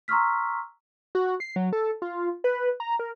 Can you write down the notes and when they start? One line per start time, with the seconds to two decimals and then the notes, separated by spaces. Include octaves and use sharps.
0.08 A#5 C6 C#6 E6 F6 B6
1.15 F#4
1.40 C7
1.56 F#3
1.73 A4
2.02 F4
2.44 B4
2.80 A#5
2.99 A#4